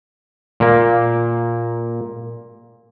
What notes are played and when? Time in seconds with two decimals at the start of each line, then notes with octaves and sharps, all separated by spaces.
0.60 A#2 A#3